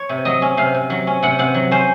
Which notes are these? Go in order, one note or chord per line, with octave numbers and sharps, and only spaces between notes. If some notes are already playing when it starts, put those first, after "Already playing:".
Already playing: C#5
C3
F#3 D#5
C#4
C3 F5
C3
F#3
C#4
C3 F#5
C3 F#5
F#3
C#4 C5